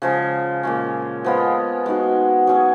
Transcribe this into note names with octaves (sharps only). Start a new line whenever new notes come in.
C#3 F3 G#3
A#2 G#3 C#4
F3 G#3 B3 F4
G#3 D#4 F#4
F#3 C#4 G#4 C#5